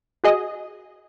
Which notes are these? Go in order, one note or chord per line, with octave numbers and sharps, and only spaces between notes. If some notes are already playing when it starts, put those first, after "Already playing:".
F#4 G#4 D#5